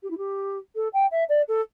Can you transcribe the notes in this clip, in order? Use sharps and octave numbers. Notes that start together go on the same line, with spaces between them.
G4
E4
G4
A4
G5
E5
D5
A4